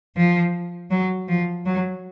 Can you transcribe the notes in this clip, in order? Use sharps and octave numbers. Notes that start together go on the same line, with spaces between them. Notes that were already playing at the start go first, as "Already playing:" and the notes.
F3
F#3
F3
F#3